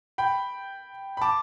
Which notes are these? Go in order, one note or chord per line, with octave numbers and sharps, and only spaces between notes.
G5 B5
B5
A5 D6